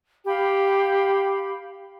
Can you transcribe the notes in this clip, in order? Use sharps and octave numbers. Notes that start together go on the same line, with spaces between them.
G4 F5 B5